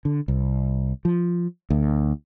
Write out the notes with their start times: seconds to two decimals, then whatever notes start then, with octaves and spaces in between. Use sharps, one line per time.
0.05 D3
0.28 C2
1.05 F3
1.70 D2